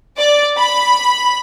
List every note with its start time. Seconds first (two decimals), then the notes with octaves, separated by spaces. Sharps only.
0.18 D5
0.57 B5